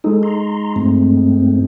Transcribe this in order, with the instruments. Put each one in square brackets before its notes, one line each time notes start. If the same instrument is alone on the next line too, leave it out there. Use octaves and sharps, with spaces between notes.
[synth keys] G#3 D#4 [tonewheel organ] A4
[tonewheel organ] A#5 C6
G2 A3 C4